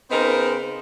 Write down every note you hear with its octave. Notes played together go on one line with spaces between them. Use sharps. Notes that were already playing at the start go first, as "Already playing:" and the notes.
C#3 B3 C4 D#4 A#4 C5